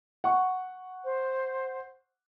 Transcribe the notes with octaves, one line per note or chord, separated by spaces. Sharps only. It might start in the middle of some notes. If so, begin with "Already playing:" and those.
F#5 C#6
C5